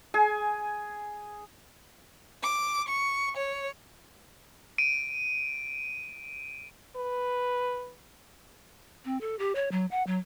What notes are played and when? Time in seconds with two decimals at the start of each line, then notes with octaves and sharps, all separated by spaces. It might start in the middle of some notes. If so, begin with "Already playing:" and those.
0.14 G#4 G#5
2.43 D6
2.88 C#6
3.37 C#5
4.78 D7 D#7
6.96 B4
9.05 C4
9.21 A4
9.39 G4
9.55 C#5
9.71 F#3
9.91 F#5
10.07 F#3